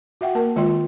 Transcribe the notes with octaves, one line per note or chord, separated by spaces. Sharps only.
F#4 E5 F#5 G5
A#3 A#4 A5
D#3 G#3 F4 D5 G5 C6